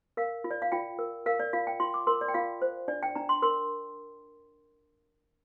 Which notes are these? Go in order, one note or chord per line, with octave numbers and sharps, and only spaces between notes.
A#4 F5
F4
D5
F5
F4 G5
A#4
A#4 F5
D5
F4 F5
G5
F4 C6
D6
A#4 C6
D5
G5
F4 F5
C5
D4 D5
G5
D4 A#5
C6
A#4 C6